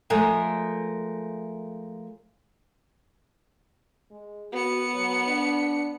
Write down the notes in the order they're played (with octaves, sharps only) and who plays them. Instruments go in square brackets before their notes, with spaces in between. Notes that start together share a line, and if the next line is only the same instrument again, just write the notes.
[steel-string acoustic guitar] F3 G#3 A3 A#4
[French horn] G#3
[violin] B3 C#7 [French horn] F#4
[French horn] F#3
D4